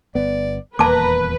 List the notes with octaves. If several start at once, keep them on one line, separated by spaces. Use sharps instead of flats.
G1 B3 D5
D#1 E2 A#3 B4 A5 A#5 D6